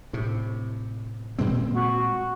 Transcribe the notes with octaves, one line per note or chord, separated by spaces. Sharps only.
A2 C3
A#2 G#3 C4
F#4